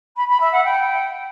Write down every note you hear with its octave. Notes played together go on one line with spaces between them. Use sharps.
B5
B5
E5
F#5
G5